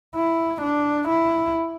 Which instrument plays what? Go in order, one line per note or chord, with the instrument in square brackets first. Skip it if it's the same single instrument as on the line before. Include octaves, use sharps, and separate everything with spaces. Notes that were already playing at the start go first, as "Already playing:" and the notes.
[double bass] E4
D4
E4